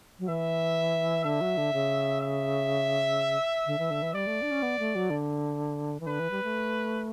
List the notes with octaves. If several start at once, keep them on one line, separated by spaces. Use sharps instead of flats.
F#3
E3 E5
D3 E5
F#3
D3
C#3
E5
D3
E3
D3
E3
G3 D5
A3
D4
C#4
B3
A3
F#3
D3
E3
D3 B4
E3
G3
A3